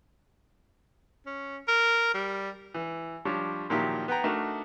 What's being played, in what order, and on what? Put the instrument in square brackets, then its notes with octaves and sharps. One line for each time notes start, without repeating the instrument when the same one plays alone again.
[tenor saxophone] C#4
A#4
G3
[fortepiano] E3
F3 G3 D4 C#5
A#2 D#3 F3 F#3 E4 G4
B3 F#5 G5 A#5
A3 D4 D#4 F#4 A#4